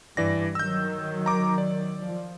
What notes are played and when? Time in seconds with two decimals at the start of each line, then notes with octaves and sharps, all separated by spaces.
0.17 G2 E3 D5 A#6
0.55 D#3 F#3 E6 G6
1.26 A#5 D6
1.58 D5
2.04 F3